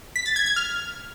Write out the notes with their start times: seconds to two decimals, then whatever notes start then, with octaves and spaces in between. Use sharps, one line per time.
0.16 B6
0.26 A6
0.36 G#6
0.46 G#6
0.56 F6